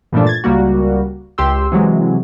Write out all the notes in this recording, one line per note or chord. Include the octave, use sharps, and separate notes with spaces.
G2 A#2 E3 F3 A3 D4
G#6 A6
C#2 G3 A#3 F#4
C#2 G4 C6 E6
C3 E3 F#3 G#3